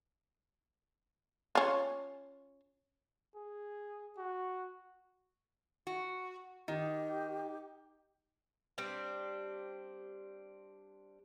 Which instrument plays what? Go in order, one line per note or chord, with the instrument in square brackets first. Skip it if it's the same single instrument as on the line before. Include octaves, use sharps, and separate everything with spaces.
[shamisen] C#4 F4
[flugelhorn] G#4
F#4
[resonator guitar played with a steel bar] F#4
[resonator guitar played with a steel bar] D#3 [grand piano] D#4 [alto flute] G4
[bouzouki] G3 C4 D4